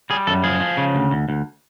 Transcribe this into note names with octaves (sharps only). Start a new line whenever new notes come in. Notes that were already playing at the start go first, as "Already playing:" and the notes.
G3 G#4
F#2 A4
F3 G#4
F3
C#3
D2
D2
D2